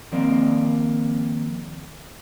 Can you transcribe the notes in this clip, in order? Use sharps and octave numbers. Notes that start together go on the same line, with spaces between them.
D#3 F3 A#3 C4 D5